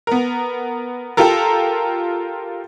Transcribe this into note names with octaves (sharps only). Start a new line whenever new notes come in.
B3 A#4
F4 G4 A4 A#4